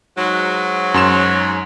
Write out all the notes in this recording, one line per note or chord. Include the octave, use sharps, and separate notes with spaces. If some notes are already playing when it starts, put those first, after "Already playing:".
G#2 F#3
F#2 C6 E7